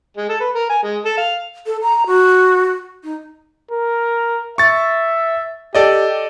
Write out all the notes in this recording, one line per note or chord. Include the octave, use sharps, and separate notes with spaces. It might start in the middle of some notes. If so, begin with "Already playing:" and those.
G#3
A4
B4
A#4
G#5
G#3
A4
F5
A4
A#5
F#4
D#4
A#4
E5 C#6 A6
G4 A4 D5 D#5